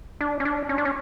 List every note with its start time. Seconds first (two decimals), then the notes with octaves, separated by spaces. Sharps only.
0.21 D4
0.40 C#4
0.45 D4
0.69 C#4
0.78 D4
0.85 C#4